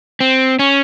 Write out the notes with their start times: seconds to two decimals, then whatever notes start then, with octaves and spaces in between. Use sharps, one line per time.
0.20 C4
0.59 C#4